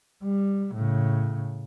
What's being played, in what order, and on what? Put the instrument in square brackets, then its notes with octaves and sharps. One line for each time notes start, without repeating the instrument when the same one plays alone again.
[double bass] G3
A2 C#3